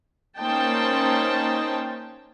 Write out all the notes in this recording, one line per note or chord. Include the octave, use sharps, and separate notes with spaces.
A#3 C#4 D#4 C5 G5 A5